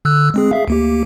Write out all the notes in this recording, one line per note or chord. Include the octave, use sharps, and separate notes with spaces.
D3 E6 F#6
G#3 C4 G#4
G#4 E5 F5
D2 A#3 G4